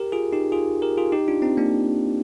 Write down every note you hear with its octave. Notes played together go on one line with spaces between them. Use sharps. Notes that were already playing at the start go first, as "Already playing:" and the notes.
Already playing: G4 A#4
F4 G#4
D#4 G4
F4 G#4
G4 A#4
F4 G#4
D#4 G4
D4 F4
C4 D#4
A#3 D4